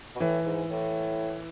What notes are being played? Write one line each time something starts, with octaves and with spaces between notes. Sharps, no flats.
B2
A2 E3
G#2
A2